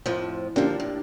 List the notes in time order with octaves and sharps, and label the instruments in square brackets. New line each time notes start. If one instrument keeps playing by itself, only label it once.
[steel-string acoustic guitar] F2 A2 F3
[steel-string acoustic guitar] D3 F3 [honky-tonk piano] A#3 D4 G4
[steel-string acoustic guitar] A2